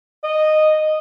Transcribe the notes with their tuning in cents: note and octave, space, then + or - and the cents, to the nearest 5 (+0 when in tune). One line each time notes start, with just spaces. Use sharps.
D#5 -10